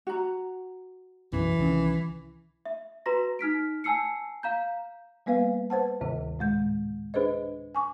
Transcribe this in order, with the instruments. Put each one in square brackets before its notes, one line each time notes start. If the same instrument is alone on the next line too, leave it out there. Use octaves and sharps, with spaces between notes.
[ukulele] F#4 A#5
[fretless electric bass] B1 F#2 [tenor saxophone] E3
[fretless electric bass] C2 D#3 C#4
[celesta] E5
F#4 B4 A#5 C6 A#6
D#4 F6 B6 D7
G#5 A5 E6 C7 C#7
F5 A#5 G6
[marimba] G3 A#3 B3 B4 F5
B4 C5 F#5 A5
D2 G#2 C3 D#3
A2 G#3 G6
D4 G#4 B4 C5 D#5
G#5 C#6 D6